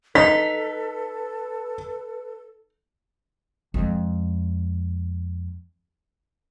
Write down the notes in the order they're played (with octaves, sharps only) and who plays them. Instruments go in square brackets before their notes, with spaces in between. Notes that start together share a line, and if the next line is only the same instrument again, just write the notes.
[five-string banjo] D#4 [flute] A4 [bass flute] B4 [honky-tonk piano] B6
[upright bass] F2 G#3